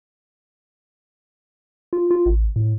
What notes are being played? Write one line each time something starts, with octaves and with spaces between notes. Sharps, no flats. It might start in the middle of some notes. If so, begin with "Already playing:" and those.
F4
F4
A1
A2